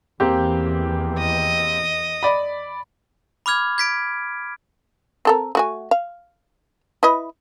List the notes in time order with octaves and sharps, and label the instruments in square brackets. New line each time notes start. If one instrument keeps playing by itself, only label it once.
[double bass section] E2 E3 [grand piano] A#3 C4 G4
[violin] D#5
[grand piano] D5 B5
[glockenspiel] B5 D6 F6 G#6
G#6 B6 D7
[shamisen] C4 A4 A#4
A3 F#4 G#5
F5
E4 B4 D#5